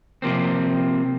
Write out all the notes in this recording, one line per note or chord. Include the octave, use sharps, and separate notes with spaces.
C3 F3 A#3 C4